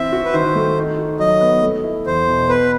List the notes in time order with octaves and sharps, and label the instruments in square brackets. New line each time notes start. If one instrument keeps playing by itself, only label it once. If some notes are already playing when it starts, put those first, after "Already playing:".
Already playing: [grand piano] E3 C4 [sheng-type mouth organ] E5
[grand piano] F#4
[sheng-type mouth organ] B4
[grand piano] D#3 [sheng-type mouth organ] C5
[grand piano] A3
D#4
F#4
[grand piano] F#3 [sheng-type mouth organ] D#5
[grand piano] B3
A3
E4
[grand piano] E2 [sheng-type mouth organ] C5
[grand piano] B2
[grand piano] B3 [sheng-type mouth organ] B4